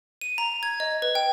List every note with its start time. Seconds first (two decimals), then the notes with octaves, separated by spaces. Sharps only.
0.21 D#7
0.38 A#5
0.63 G#6
0.80 D#5
1.02 B4
1.15 G5